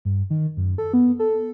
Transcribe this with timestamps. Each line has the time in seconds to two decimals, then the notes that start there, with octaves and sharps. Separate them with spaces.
0.05 G2
0.30 D#3
0.57 F#2
0.78 A4
0.93 B3
1.19 A4